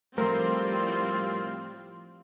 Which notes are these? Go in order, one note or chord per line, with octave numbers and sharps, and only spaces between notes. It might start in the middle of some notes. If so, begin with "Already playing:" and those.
A2 F3 G3 A3 C4 F4 A#4 C5